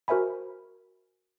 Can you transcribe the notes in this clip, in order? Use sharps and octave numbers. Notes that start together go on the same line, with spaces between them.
F#4 A#4 C5 E5 G#5 B5